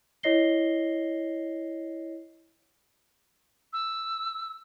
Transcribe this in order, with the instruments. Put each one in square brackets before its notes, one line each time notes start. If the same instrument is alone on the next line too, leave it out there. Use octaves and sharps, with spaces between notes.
[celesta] E4 C#5 D#5 A#6 C7 G7
[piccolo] E6